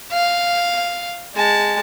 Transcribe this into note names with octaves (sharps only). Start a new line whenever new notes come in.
F5
G#3 A5